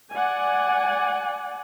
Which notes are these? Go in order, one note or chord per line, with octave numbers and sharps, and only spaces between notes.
D5 F#5 G#5